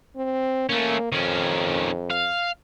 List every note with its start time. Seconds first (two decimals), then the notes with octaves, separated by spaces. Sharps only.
0.16 C4
0.69 A3 A#3 C#4
1.12 F2 D#3 C#4
2.11 F5